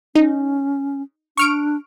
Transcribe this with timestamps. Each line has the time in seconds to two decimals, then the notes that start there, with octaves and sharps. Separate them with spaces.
0.15 C#4 D#4
1.37 D4 C#6 F6 D7